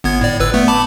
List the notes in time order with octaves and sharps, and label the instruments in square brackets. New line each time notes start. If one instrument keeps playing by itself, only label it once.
[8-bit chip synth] G1 B3 G#6
A2 D5
G1 B4 E6
A3 B3
A5 B5 D6